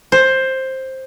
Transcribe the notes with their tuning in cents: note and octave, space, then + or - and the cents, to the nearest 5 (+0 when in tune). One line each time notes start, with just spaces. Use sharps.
C5 +10